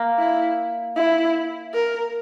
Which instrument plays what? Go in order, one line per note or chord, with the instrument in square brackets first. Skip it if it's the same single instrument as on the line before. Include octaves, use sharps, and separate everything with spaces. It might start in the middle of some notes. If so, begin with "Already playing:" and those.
Already playing: [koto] A#3
[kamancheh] E4
E4
A#4